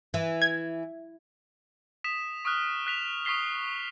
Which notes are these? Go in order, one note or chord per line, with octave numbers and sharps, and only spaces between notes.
E3
G#6
D#6 B6 E7
C#6 D#6 F6 F#6
F#6 B6 F7
C#6 D#6 B6 C7 G7